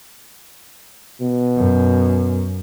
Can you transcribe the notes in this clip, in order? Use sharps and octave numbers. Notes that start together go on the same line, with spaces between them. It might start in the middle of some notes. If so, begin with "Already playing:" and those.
B2
F#2